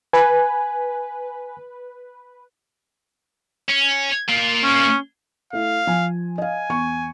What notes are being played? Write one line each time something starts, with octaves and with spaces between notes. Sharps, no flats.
B4 G#5
C#4
A#3 F4
C#4
A3 E4 F5
F3 G#5
D#5 F5 G#5
E2 C#6